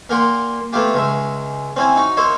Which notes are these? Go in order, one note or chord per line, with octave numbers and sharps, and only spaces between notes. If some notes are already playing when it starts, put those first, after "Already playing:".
A#2 A#3 A#4 F#5 G5 C6
A3 B3 E4 F4 G4
C#2 G#3 E5
C4 C#4 E4 G#5
D#4 F#4 A#5
A#3 D#4 C5 C#5 E5